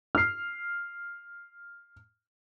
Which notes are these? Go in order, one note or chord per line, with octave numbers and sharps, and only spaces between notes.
F6 C7